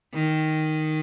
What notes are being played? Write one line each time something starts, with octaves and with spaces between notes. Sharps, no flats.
D#3